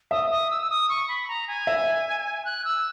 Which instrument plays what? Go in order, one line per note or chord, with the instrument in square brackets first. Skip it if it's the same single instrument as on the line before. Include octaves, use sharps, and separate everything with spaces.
[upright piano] E5 [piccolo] D#6
[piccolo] D#6
E6
E6
D#6
C#6
B5
A#5
G#5
[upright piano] E5
[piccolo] F#6
E6